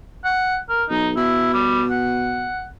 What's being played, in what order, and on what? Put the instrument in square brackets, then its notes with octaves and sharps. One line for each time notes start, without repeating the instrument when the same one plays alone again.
[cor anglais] F#5
A#4
[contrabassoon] B1 [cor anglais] D#4
[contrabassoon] B2 [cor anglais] E4
[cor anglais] G3
F#5